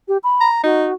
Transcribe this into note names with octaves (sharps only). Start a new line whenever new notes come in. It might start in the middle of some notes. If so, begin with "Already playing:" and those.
G4
B5
A#5
D#4 F#4